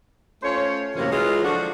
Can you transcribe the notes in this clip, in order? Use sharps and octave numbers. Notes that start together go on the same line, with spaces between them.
A3 C#4 F4 C5 C#5
F#2 A2 C3 E3 A#3 C#4
E3 F#3 G#3 F4
D3 F3 D4 F#4